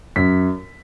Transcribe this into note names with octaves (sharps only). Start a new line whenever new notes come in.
F#2 B6